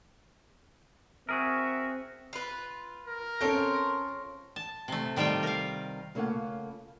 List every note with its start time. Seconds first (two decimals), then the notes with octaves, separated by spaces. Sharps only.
1.29 C4 F#4 G#4 A#4 E5
2.33 F4 B4
3.06 A#4
3.41 C4 C#4 F4 A4 C#5
4.56 A5
4.88 C3 A3
5.16 D#3 G3 A3 F4 G5
5.43 A#4 F5
6.15 C#3 A3 A#3 C#4 F4 F#5